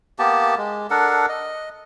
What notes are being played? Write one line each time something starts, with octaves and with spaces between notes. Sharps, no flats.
A#3 B3 G4 A5
G#3
D4 A4 A#4 F#5
D#5